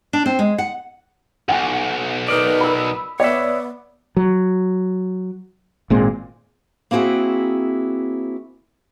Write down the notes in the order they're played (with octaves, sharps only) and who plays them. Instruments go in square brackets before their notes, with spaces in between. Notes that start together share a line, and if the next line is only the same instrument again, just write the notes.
[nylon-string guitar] D4
C4
G#3
F#5
[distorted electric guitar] B1 F#2 [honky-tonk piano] F#5 G#5
[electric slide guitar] D#4 A#4 D5 [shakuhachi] B4
[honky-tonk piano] B5 E6
[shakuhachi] B3 [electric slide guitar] C#5 E5 [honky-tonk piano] D5
[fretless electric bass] F#3
G#1 A#2 G#3 C4
[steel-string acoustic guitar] A#3 C4 E4 F#4 G#4